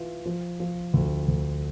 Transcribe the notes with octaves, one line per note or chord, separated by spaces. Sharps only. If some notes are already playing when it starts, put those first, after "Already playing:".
Already playing: E3 F4
F3
F3
D2
D2